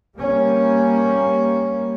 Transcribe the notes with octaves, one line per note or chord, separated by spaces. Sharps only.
G3 A#3 C#4